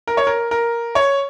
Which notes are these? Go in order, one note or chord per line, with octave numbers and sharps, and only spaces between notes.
A#4
C#5
A#4
A#4
C#5